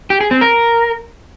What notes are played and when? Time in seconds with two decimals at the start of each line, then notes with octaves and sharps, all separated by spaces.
0.10 G4
0.21 G#4
0.31 C4
0.41 A#4